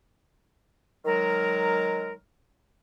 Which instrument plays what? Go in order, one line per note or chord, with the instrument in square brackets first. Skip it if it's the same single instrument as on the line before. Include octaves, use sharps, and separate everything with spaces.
[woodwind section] D#3 F#3 G#3 A#4